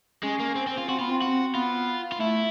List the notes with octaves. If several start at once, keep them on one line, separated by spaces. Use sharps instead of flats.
G#3 C#4
A#3
C4
C4
F4
C4 F#4
B3 F4
C4
F#4
B3 F4
F4
A3 E4